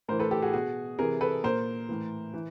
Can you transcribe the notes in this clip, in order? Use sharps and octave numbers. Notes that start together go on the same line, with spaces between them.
A2 E3 A#4 C5
A4 B4
G4 A4
F#4 G#4
B2 F#4 G#4
C3 E3 G#4 A#4
A4 B4
A#2 A#4 C5
A2 E3
E3